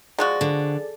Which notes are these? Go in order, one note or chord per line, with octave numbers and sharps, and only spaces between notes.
F3 G#3 F#4 G#4 D5 A6
D3